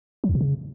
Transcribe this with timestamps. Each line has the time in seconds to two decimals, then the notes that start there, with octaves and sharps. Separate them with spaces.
0.24 F#3
0.29 E2
0.35 B2
0.41 C#3